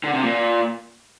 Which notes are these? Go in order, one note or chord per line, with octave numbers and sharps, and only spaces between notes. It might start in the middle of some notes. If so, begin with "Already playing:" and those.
D3
C3
A#2